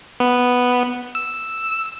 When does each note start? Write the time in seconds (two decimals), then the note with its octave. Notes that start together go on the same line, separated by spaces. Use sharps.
0.20 B3
1.15 E6